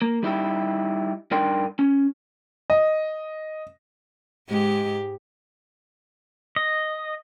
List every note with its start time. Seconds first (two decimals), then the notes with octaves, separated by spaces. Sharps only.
0.02 A#3
0.23 G3 D#4 E4 G4
1.31 G2 D4 D#4 A#4 G5 C6
1.79 C#4
2.70 D#5
4.48 G#2 G#3 G4
6.56 D#5